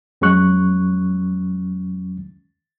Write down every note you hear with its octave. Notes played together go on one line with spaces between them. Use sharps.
F2 F#3 G#3 C#4 C#6 F#6